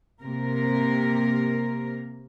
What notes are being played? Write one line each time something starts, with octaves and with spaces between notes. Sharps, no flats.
C3 A#3 A#4